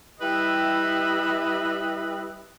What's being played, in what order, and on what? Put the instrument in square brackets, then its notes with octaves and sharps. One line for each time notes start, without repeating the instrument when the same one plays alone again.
[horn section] G3 E4 G4 B4 D#5 E5